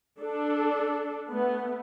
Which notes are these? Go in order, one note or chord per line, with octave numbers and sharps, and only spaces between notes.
D4 A4
A3 B3